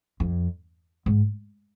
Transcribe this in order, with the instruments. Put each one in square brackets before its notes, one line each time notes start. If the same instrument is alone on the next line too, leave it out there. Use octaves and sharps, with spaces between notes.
[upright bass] F2
G#2